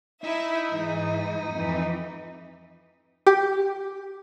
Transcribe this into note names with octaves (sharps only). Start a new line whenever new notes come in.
D#4 E4 E5
G#2 E3
F2 E3
G4